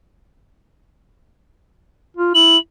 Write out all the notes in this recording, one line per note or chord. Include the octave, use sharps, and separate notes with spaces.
F4
E4 F#7